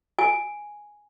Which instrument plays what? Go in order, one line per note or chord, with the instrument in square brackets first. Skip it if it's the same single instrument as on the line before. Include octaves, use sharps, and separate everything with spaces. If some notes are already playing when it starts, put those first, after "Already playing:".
[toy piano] G#5